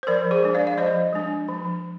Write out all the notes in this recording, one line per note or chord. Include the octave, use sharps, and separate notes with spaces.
C5
F3 A#4 D5
G#4 C5
G#3 D4
D5 F5
F5
F3 C5 D#5
G#3 D4
F3